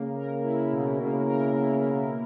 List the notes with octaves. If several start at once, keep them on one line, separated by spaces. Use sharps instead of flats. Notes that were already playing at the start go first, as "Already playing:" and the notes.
Already playing: C#3 A#3
A#4
E4
B2
C#3 A#3
A#4
E4
B2